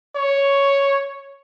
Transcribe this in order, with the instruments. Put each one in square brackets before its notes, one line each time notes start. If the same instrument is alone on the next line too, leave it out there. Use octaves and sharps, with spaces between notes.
[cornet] C#5